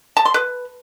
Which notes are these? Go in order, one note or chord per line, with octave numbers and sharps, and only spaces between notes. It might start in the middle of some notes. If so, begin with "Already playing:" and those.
A5
C6
B4